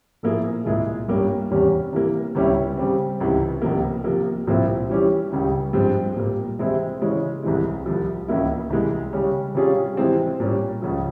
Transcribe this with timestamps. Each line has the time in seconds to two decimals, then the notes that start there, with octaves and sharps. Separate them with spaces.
0.23 A#2 F3 A#3 E4 G#4
0.65 C2 A#2 G#3 E4 G#4
1.08 G2 G3 A#3 C#4
1.51 E2 C3 G3 C#4
1.93 C3 E3 A#3
2.35 C#2 C3 G3 C#4 E4
2.77 C#3 G3 C4
3.20 C#2 C3 E3
3.62 C#2 C3 F3 A#3
4.04 C3 F3 A#3
4.47 C2 A#2 F3 C4 E4
4.90 E3 G3 C#4 G4
5.32 C#2 C#3 G3
5.73 G2 F3 G#3 C4
6.16 A#2 G3 A#3
6.59 C3 E3 G#3 C4 E4
7.01 C#3 E3 G#3 C#4
7.43 C2 C3 E3 G#3
7.86 C2 C3 F3
8.28 C#2 C#3 E3 A#3 E4
8.70 C2 C3 E3 G#3
9.13 C#3 G3 C#4
9.55 C3 G3 C#4 F4 G#4
9.97 C3 E3 G#3 C4
10.40 A#2 G3 C#4
10.82 C#2 C#3 F3